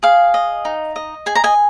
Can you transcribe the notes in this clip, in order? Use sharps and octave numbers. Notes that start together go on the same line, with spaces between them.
G#4 F5
D#5
D#4
D#5
G#4 G#5
A#5
D#5 G#5